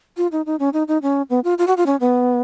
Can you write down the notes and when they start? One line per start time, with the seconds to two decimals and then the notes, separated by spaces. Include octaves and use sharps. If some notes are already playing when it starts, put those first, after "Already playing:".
0.17 F4
0.32 D#4
0.46 D#4
0.59 C#4
0.73 D#4
0.88 D#4
1.02 C#4
1.30 B3
1.44 F4
1.58 F4
1.67 F#4
1.77 F4
1.86 C#4
2.00 B3